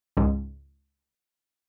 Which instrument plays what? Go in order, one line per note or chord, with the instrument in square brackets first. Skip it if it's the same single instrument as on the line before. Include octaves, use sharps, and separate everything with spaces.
[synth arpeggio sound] C#2 G#2